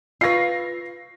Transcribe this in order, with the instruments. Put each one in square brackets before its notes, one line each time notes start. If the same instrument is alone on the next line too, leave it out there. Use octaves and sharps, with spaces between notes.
[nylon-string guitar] F4 B4 [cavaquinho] F5 C#6 [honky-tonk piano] A#6 C7